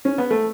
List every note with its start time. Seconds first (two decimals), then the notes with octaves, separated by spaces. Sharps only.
0.05 C#4
0.18 B3
0.30 A3